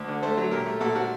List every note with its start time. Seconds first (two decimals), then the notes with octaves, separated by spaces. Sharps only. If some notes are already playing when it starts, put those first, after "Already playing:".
Already playing: D2
0.08 D3
0.23 A3 A4 C5
0.37 F#3
0.51 A#2 G4 A#4
0.66 A3
0.80 A#2 F#4 A4
0.95 C4 F#4 A4